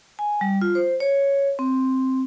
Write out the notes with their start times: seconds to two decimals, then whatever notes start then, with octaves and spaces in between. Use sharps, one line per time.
0.19 G#5
0.41 G3
0.61 F4
0.75 C5
1.00 C#5
1.59 C4